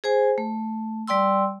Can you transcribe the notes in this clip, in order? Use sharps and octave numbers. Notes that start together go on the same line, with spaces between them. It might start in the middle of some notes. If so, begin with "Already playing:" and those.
G#4 C5 G#5
A3
G3 D5 G5 C6 E6